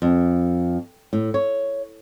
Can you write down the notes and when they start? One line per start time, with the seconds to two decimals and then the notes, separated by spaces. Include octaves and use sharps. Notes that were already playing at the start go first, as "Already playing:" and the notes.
0.02 F2
1.13 A2
1.34 C#5